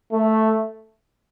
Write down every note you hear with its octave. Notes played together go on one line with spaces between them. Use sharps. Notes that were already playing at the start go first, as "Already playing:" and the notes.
A3